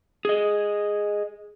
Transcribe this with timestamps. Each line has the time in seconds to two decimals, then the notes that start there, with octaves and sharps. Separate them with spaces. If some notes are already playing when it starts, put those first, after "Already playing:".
0.25 G#4 D#5